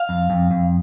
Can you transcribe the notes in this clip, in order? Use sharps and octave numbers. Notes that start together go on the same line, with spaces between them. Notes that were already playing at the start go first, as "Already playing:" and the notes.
Already playing: F5
F2
F2
F2